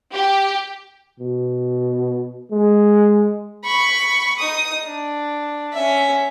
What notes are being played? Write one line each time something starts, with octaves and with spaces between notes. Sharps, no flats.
G4
B2
G#3
B5 C#6
D#4 D#6
D4
C#4 E5